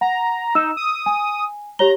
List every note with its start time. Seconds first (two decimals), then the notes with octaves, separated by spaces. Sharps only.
0.01 F#5 A#5
0.55 D#4 E6 E7
0.77 D#6
1.06 G#5
1.79 G4 C#5 A#5 G7